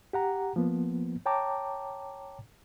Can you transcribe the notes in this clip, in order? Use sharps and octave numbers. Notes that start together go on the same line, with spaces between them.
G4 F#5 A#5
F3 A#3 B3
C#5 G5 A5 A#5 D6